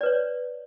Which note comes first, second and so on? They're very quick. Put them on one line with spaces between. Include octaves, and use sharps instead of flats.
D5 B4 C#5